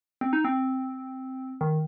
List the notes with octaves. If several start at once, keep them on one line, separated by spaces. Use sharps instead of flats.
C4
D#4
C4
D#3